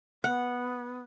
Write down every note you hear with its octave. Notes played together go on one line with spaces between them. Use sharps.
B3 F#5